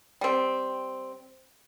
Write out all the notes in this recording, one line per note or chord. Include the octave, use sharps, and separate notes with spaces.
G3 C4